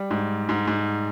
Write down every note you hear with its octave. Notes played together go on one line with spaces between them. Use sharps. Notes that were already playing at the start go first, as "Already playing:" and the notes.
Already playing: G3
G#2
G#2
G#2